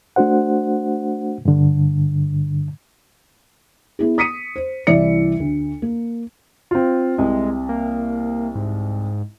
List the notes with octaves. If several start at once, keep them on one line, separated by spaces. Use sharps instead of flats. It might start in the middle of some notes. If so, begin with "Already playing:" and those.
A3 D4 F#4 C5 F#5
G2 D3
B3 E4 G#4
D#6 B6 C#7 D#7
C5
C2 E3 E4 D5 E5 C#7
D2
A#3
C4 F4
C2 C3 G#3
A#3
G#2